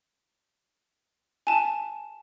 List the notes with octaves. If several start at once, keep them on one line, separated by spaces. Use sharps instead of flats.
G#5 A5